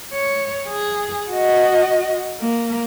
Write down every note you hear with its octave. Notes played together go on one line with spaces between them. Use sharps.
C#5
G#4
F#4 D#5
A#3